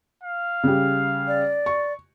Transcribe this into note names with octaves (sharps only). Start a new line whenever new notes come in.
F5
C#3 G3
D5
C#6